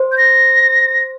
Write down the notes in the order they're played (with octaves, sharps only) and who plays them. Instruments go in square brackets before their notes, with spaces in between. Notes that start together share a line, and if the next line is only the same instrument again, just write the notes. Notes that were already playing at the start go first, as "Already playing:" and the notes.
Already playing: [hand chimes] C5
[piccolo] G6
A#6